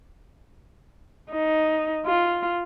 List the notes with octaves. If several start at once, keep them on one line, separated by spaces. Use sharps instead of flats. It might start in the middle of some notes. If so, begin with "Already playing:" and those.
D#4
F4